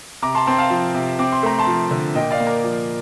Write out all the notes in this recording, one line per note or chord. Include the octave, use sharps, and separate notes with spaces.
C3 A#5 D6
A5 C6
C4 A5 C6
F5 A5
F3
C3
C4 D6
C6
A3 A#5
A5 C6
F3
D3
A#2 D#5 G5
D5 F5
A#3
A#4
F3